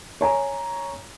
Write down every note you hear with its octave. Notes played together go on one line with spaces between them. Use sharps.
C#5 G#5 A#5